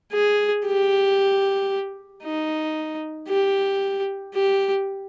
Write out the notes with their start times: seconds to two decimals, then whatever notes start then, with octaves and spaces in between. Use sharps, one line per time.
0.13 G#4
0.66 G4
2.23 D#4
3.28 G4
4.34 G4